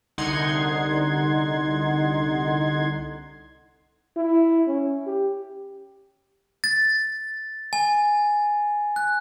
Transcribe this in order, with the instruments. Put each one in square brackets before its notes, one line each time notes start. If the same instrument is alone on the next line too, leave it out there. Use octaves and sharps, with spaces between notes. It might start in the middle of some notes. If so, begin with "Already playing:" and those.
[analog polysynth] C2 D3 D#4 F#5 C6 G#6
[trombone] E4
C#4
G4
[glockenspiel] A6
G#5
F#6